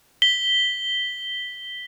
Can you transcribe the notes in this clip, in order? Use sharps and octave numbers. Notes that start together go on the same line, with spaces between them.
B6 G7